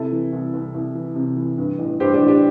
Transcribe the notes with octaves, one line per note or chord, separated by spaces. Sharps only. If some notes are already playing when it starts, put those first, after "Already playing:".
Already playing: C3 E4 A4
E3
C2
C2
C2
E3
C3
E3
G2
A1
G2 G4 C5
D4 G4
A1
D4 G4